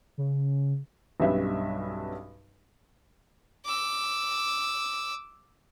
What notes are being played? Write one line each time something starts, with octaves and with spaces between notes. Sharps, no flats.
C#3
B1 G2 G3 C#4 B4 E5
D6 E6